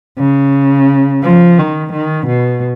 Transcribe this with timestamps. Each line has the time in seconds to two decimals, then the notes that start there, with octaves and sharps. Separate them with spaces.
0.19 C#3
1.23 F3
1.58 D#3
1.93 D#3
2.27 B2